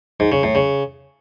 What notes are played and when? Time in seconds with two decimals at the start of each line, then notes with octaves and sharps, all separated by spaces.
0.20 G#2
0.32 C#3
0.43 A2
0.55 C#3